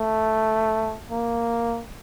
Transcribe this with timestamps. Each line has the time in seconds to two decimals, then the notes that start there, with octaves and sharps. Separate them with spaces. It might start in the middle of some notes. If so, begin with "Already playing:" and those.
Already playing: A3
1.10 A#3